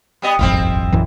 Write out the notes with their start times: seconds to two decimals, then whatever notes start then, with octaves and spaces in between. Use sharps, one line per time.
0.22 G3 B3 D#5
0.39 D#1 G#1 F2 C4 E4 F4
0.92 A#1 F#2 E3